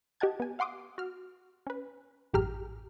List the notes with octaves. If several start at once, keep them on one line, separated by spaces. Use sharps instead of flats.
G4 D#5 F#5 A5 G#6
B3 G#5
F5 F#5 C6 D6 D#6
F#4 F6
C#4 B4
A1 F#2 G4 G#4 A#5 F6